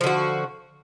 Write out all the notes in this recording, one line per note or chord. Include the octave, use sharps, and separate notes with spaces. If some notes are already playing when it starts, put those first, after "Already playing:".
D3 F3 F#4